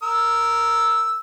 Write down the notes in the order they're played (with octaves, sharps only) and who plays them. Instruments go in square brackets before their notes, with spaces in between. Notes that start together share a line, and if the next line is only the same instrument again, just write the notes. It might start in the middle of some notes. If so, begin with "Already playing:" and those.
[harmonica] A#4 E6